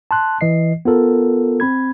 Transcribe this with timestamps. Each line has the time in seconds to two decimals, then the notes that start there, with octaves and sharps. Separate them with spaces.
0.11 A5 C6 F#6
0.41 E3 D#5 C7
0.85 B3 F4 A4 A#4
1.60 C4 B5 G#6